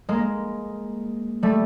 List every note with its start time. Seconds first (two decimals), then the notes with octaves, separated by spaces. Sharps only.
0.09 G#3 A#3
1.43 G3 A3